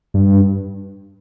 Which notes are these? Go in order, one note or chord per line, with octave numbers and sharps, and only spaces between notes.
G2